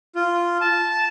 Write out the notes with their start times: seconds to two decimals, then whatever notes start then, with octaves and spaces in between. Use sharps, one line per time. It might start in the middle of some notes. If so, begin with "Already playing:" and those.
0.16 F4
0.61 A5